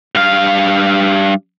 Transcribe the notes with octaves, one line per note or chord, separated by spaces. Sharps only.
G2 F5